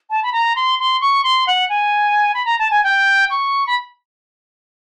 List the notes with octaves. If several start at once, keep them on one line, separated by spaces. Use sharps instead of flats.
A5
B5
A#5
C6
C6
C#6
C6
F#5
G#5
B5
A#5
A5
G#5
G5
C#6
B5